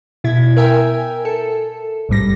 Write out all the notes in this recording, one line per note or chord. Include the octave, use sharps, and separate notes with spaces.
B2 E4 G#6
A#4 E5 G5 G#5
A4
A1 G#2 G3 A#6